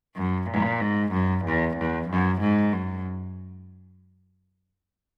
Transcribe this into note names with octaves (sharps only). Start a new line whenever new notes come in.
F#2
A#2
G#2
F#2
E2
E2
F#2
G#2
F#2